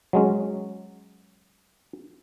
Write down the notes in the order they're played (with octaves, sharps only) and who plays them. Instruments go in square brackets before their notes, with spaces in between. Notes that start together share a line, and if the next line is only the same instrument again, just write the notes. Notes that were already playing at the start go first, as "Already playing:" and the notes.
[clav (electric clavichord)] F#3 G#3 C#4